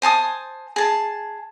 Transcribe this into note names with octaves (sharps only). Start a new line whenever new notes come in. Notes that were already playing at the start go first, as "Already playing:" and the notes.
C5 G#5 A5 D#6
G#4 A5